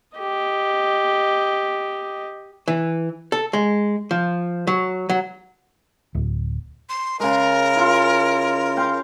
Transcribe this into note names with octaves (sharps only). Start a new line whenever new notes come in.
G4 D#5
E3
A4
G#3
F3
F#3
F#3
D1
C6
C#3 G#3 A#4
E4 F4
F5 G5 C6